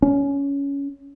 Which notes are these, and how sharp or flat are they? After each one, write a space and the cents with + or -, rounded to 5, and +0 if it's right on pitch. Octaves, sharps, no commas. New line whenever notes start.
C#4 +15